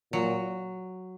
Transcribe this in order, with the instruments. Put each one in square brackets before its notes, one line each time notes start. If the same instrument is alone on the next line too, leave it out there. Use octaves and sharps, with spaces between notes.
[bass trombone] A#2 [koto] F#3